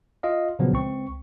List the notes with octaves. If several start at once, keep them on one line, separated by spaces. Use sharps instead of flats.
F4 D#5 F5
A#2 C#3 F3 F#3 B3
C#2 C4 C#6